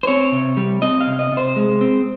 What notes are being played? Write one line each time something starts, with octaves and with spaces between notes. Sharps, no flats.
C5
C4 C#5
C3
G3
C4 D#5
F5
C3
D#5
C3
C5
G#3
C4